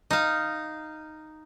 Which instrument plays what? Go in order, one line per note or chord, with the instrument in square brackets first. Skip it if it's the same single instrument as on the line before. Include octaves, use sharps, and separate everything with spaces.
[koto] D#4 F5